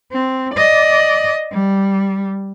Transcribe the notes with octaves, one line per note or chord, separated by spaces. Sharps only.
C4
D5 D#5
G3